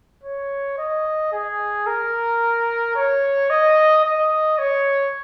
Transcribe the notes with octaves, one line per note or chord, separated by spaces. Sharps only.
C#5
D#5
G#4
A#4
C#5
D#5
D#5
C#5